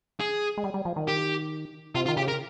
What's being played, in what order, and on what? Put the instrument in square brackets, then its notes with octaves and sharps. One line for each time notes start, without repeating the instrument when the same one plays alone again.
[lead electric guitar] G#4
[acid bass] G#3
G3
G3
F3
D#3
[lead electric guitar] G4
[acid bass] C3 [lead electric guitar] F4
[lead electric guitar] F4
[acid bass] D#3
[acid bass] C#3 [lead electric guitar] G4
[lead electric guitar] A#4